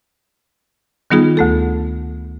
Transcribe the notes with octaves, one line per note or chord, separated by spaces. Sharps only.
D#3 G3 B3 D#4 F4 G#4
D2 A3 A4